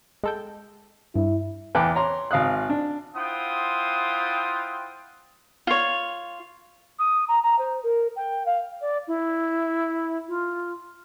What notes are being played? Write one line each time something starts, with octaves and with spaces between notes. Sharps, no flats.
G#3 A4 G5
G2 E4
E2 E3 G5 A5 D6 F#6
C#5 A#5 C6
G#1 F5 D#6 F#6
D4
E4 F4 C5 F#5 G5 D#6
F4 C#5
D#6
A#5
A#5
C5
A#4
G5
F5
D5
E4
F4